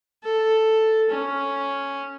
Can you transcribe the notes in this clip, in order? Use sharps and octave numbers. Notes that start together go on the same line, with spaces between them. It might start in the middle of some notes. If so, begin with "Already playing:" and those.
A4
C#4